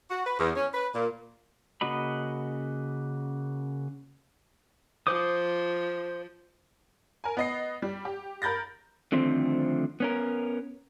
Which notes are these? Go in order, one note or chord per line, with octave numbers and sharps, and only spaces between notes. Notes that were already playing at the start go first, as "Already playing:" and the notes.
F#4
B4
E2
C#4
B4
A#2
C#3 A#3 F#4 D#5 B5
F3 C5 D6 D#6
A#4 G#5
B3 D#5 C7
G3
G4
A#4 B5 G6 A6 A#6
D3 D#3 F3 A3 C4 C5
B3 C#4 A#4